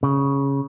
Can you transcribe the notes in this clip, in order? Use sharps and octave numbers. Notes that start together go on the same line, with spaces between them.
C#3